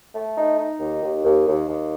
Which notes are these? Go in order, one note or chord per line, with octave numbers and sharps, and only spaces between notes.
A3
D#4
D#4
D#2
D#2
D#2
D#2
D#2